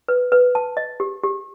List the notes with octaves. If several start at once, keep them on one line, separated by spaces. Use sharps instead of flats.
B4
B4
A5
D#5
G4
G4